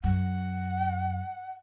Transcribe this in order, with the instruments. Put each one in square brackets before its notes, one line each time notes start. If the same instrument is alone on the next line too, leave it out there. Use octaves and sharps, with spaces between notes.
[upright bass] F#2 [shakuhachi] F#5